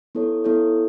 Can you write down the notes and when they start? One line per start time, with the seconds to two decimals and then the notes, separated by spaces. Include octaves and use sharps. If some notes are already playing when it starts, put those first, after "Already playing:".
0.15 B3 E4 A4 C#5
0.44 B3 E4 A4 C#5